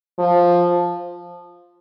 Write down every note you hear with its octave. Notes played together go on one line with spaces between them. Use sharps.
F3